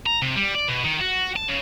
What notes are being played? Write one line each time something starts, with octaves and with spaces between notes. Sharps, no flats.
A#5
C3
G3
D5
B2
D#3
F#4
A5
C#3